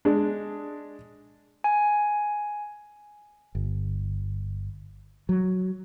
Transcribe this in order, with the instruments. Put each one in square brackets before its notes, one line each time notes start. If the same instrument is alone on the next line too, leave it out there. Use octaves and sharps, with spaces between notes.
[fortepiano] G#3 D4
[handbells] G#5
[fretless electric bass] G1
F#3